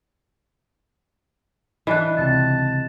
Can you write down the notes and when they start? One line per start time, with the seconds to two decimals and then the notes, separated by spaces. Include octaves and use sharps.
1.87 E3 D4 D#5 F#6
2.17 C#2 A2 C3 A5